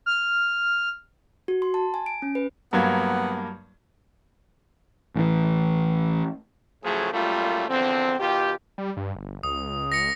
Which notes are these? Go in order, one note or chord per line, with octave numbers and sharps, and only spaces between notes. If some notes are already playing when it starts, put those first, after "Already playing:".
F6
F#4
C6
A5
G#5
D7
C#4
B4
G2 F#3 A#3 B3
A1 E3
A2 C#3 F3 F#3 A3 G#4
F#2 A#2 G3 A3 F4
E2 D3 F3 C4
B2 D#3 F4 G4
G3
G2
G1
C#2 D#6
A#6 C#7